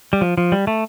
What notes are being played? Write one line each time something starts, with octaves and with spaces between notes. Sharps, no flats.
G3
F3
F3
G3
A3